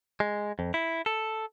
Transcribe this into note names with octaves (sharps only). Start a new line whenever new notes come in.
G#3
F2
E4
A4